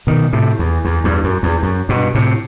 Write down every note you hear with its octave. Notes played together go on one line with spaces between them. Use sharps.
B2 D#3
A2 C3
E2
E2
E2 G2
F#2
E2
F#2
G2 B2
A2 C3